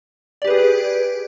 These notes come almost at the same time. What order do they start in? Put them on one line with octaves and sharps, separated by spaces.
D5 G4 B4 G#4